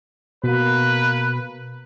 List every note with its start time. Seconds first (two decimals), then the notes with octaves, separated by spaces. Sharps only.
0.44 B2 A#3 B4